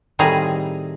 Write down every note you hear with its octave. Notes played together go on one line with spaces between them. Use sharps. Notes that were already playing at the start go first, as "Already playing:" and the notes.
A2 D#3 G3 C4 G#4 A#5